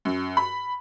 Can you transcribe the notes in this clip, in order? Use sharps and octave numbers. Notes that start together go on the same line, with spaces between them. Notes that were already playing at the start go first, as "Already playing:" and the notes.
F#2
B5